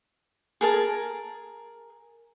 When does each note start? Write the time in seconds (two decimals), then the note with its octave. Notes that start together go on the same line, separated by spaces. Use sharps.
0.61 G#4 A#4 A5